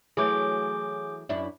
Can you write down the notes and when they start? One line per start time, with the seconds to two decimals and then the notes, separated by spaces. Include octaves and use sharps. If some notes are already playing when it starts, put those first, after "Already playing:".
0.17 E3 F#3 A3 G#4 D6 G6
1.29 F#2 D4 E4